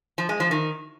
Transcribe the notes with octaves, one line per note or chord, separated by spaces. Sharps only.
F3
G#3
F3
D#3